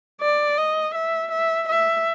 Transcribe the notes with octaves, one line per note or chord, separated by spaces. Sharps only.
D5
D#5
E5
E5
E5